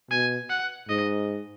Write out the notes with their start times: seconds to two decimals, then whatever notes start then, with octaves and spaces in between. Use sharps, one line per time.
0.11 B2 G#5
0.50 F#5
0.89 G#2 D#5